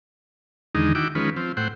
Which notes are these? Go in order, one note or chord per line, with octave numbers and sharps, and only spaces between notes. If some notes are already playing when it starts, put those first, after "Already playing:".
E2 D3 D#3 G#3 D#4
D#3 E4 F#4 G5 D6
D#3 F3 G#3 C#4 B4
F3 C4
A2 C5 F#5 G5